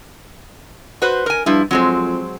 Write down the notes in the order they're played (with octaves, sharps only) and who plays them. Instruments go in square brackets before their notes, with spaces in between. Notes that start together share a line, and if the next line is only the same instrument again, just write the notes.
[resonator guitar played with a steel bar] F#4 B4 C5
A#4 G#5
[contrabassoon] G2 [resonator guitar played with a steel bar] F3 E4
[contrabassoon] F2 [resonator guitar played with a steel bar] F#3 G#3 C4